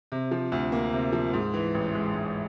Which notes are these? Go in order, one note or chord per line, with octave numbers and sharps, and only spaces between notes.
C3
F3
D2
A#3
C3
F3
G#2
E3
A1
G#3
G#2